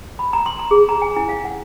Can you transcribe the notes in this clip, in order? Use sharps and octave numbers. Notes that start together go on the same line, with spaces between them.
B5
A#5
C6
A#5
G#4
A#5
G#5
E4
F5
F#5